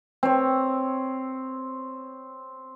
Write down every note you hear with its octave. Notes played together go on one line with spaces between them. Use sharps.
C4 C#5